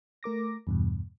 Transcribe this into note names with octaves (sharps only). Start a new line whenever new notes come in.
A3 A#4 D6 A#6
E2 G2 B2